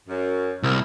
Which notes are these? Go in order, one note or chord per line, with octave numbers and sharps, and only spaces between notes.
F#2
C2 C4 E4 A#4